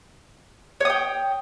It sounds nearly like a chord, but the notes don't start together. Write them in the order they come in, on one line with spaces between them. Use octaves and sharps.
C#5 D#6 G5